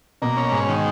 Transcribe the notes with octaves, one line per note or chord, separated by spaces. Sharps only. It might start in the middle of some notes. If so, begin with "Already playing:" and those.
B2 A#3
C#4
G#2
D#3